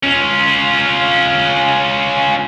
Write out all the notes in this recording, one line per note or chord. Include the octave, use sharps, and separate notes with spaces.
C#4 F4